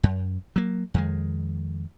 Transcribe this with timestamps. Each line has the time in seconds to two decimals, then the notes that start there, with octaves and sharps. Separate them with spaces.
0.03 F#2
0.56 F#3 A#3
0.94 F2 D#3 G#3